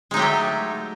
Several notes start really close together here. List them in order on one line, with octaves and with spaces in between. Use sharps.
G#3 D#4 F#3 G4 A3